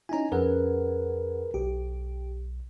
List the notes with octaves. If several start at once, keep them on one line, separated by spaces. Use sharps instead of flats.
C#4 D#4 E4 G#5 A#5
F2 C#4 G#4 A#4 B4 F#5
B1 G4